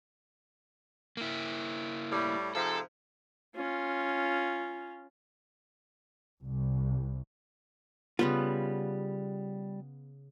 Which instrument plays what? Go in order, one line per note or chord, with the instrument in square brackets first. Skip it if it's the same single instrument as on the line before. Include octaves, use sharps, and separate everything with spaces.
[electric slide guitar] A#3 E4
[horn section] A2 G3
[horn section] G#2 C3 F3 [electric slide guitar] A4
[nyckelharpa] C#4 F4
[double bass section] C2
[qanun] C#3 B3 [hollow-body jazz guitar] G3 F4